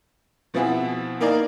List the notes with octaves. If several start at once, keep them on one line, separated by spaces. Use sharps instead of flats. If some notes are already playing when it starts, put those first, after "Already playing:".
B2 F3 C4 E4 F#4 G#4
A#3 D#4 A#4 D5 F5